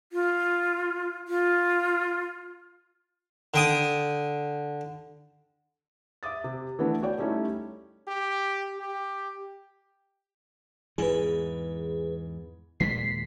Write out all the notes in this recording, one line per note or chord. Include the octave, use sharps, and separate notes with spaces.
F4
F4
D3 G5 D#6
E5 D6 D#6 A6
C3
E3 A3 B3 D4
F#4 C#5 D5 G5
G3 A3 C#4 D#4 E4
G4
G4
E2 G#2 E3 G#4 B4
D#2 A#2 G#3 B6 C7